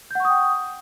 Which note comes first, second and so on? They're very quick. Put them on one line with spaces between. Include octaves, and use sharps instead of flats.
G6 F#5 C#6 D#6 G5